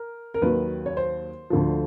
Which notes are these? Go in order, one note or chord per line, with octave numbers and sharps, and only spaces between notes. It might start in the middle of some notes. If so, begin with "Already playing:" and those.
Already playing: A#4
A#4
D#2 D#3 F#3 B4
C#5
C5
D2 D3 F3